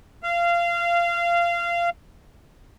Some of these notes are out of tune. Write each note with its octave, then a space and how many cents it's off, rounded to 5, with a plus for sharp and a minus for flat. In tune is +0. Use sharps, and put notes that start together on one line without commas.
F5 -20